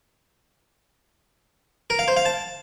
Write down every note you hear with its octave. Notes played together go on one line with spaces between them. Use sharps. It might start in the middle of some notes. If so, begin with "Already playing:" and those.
A#4
F5
C5
F5
A5